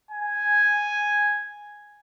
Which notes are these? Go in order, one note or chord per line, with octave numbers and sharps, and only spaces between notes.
G#5